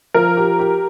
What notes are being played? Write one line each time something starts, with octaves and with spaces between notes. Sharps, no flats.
F3 A#4
G4
G4